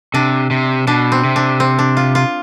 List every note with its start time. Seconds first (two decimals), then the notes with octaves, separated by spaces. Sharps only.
0.14 C3 D4
0.51 C3
0.87 B2 D4
1.12 C4
1.24 C3
1.36 D4
1.60 C4
1.79 D4
1.97 F4
2.15 F4